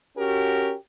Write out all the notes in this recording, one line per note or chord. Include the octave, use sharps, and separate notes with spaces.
C#4 F#4 G4 A#4